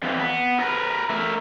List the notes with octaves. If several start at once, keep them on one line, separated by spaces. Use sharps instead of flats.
F2 E3
B3
A#4 B4
A3 A#4